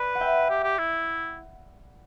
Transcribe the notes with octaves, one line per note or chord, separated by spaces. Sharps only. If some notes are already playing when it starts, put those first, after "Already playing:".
Already playing: B4 D5 B5
F#5
E5 G5
G4
G4
E4